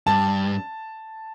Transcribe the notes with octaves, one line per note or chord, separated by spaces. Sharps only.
G2 A5